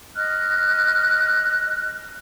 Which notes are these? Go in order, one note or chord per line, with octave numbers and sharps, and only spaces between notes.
D#5 F6 F#6